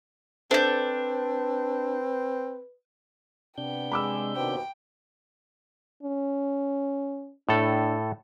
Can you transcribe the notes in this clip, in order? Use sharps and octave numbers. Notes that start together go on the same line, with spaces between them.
C4 D4 A4 B4 C5 E5 G6
C3 B3 D4 G5 G6
G#3 B5 D6 E6
D#2 B2 C5 G5
C#4
A2 D4 A4